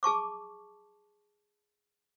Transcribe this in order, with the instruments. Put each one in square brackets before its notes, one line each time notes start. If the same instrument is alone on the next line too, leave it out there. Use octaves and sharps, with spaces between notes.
[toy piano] G#4 A5 C#6 D6